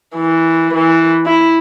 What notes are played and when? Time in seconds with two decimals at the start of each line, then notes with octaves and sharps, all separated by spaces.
0.15 E3
0.75 E3
1.26 E4